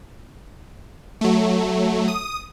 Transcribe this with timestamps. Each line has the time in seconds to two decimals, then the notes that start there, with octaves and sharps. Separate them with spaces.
1.21 F#3 A3
2.08 D#6